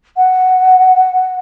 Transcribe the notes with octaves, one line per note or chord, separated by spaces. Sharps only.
F#5